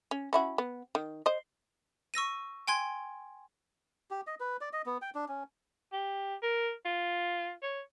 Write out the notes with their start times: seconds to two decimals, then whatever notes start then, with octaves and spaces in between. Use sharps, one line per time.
0.11 C#4
0.33 C#4 E4 F#4
0.58 B3
0.95 D#3
1.26 C5 D#5
2.14 C#6 E6 A#6 D#7
2.68 G5 G#5 C6 G#6
4.11 G4
4.27 D#5
4.40 B4
4.61 D5
4.73 D#5
4.86 B3
5.02 G5
5.15 D4
5.28 C#4
5.92 G4
6.43 A#4
6.85 F4
7.62 C#5